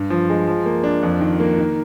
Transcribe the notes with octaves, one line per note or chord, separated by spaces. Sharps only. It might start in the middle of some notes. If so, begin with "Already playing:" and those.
Already playing: G2
F3
G#3
F3
A#3
D4
F2
D#3
A#3
D#3